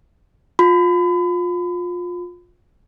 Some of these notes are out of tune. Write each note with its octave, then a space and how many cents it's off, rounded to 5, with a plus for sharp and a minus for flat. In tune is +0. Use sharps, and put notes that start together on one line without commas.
F4 +25 B5 +35